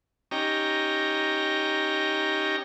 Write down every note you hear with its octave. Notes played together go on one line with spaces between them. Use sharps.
C#4 D#4 G4 A#5